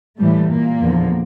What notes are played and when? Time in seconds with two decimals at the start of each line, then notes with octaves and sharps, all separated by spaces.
0.18 A2 E3 G3 A3
0.50 A#2 A#3
0.81 E2 D3 F3